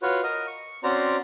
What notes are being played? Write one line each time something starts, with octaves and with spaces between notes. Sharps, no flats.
F4 F#4 B4 C#5
A#4 D#5
C#6
C4 C#4 F#4 C5 D5 A#5